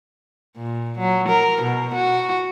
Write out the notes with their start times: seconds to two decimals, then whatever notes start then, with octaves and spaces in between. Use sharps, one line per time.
0.57 A#2
0.98 F#3
1.29 A#4
1.62 B2
1.94 F#4